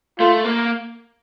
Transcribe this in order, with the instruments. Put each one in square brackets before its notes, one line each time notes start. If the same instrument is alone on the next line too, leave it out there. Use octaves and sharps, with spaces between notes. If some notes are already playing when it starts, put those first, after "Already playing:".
[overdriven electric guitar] A3 [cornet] F4
[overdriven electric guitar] A#3